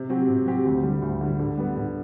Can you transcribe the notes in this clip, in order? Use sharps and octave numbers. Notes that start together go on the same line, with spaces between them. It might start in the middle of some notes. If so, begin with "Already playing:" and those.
Already playing: C3
F#3 C4 G4
C3
F#3 C4 G4
D2
D3 G3
D2
D3 G3
D3
G3 B3
D3